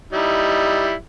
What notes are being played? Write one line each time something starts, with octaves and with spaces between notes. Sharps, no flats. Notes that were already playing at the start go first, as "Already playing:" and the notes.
G3 D#4 E4